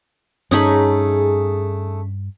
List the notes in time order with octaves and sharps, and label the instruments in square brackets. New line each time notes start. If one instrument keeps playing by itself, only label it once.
[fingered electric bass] G2 [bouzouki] A3 G#4 [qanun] C#4 D#4 B5